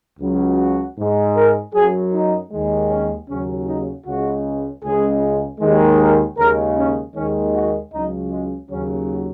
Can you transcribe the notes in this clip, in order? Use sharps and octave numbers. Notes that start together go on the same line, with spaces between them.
C#2 C#3 F#3
F#4
G#2 G#3
A#4
F#2 F#3 G#4
D#4
D#2 D#3 G#3
C#4
D#2 C#3 F#3 C#4
D#4
C#2 C#3 G#3 F#4
C#2 C#3 G#3 G#4
D#2 D#3 G#3
A#4
D#2 C#3 G#3 A#4
C#4
D#2 D#3 G#3 C#4
F#4
C#2 C#3 F#3 D#4
G#3
D#2 C#3 F#3 C#4